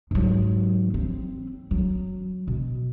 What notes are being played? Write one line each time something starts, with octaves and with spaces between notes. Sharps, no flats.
G#2 F#3
C4
F#3
B2